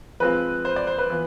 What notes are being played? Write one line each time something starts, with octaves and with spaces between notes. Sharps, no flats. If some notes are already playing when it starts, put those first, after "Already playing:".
F3 G#3 C4 F4 B4
C5
D5
C5
B4
E3 B3 F4